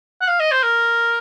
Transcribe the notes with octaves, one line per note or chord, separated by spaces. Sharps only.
F#5
F5
D#5
C5
A#4